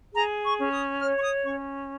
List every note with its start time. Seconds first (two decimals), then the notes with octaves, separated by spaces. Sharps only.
0.14 G#4 A#5
0.43 C#6
0.58 C#4
0.72 D#6
1.01 C#5 F6
1.17 C#6
1.22 D#6
1.44 C#4 C#6